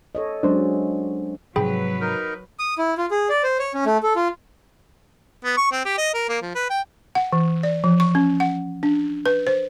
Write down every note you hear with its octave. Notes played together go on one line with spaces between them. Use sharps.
A4 C#5 D#5
F#3 G#3 C#4 D4 C5
G#2 C3 F3 F#3 G#4 B4 G5 B5
D#4 A#4
D#6
E4
F4
G#4
D5
C5
C#5
C#4
A3
A4
F4
B3
C#6
C4
G4
D#5
A#4
A#3
F3
B4
G5
F#5
E3
D5
F3
C#6
C#4
F#5
D4
B4
C5